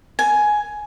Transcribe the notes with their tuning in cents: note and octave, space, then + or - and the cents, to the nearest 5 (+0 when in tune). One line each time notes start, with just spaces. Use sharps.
G#5 +10